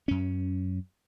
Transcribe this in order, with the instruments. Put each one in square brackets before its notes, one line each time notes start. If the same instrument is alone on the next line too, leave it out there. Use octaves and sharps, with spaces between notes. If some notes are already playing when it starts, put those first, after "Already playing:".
[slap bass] F#2 C#4